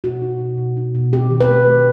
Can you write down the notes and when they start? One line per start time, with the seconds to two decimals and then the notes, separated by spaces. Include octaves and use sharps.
0.04 B2 F#4
0.22 D#4
0.40 B2
0.58 B2
0.77 D#4
0.95 B2
1.13 C4 G4
1.30 D#3
1.40 B4
1.49 A3
1.66 A3